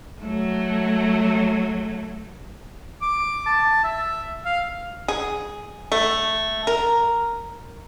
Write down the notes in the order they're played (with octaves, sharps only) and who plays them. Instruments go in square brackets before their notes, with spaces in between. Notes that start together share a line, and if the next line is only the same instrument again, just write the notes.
[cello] F#3 A3
[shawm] D6
A5
E5
F5
[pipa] G#4
A3
A#4